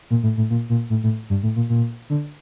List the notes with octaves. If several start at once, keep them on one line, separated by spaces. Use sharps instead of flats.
A#2
A2
A2
A#2
A#2
A2
A2
G2
A2
A#2
A#2
D3